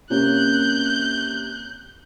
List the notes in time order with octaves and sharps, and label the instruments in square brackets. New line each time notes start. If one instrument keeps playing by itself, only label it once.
[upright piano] C3 A#3 C#4 [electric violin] F#6 G6